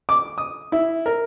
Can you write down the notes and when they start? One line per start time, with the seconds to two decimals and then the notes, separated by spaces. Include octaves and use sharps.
0.09 D6
0.38 D#6
0.72 E4
1.06 A#4